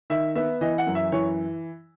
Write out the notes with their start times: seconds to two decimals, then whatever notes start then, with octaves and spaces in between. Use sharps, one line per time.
0.10 D#3 E5
0.35 B3 E5
0.61 E3 D#5
0.78 F#5
0.87 F#2
0.95 E5
1.12 E3 C#5